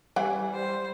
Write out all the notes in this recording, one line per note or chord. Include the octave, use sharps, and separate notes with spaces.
E3 G3 F#5
C5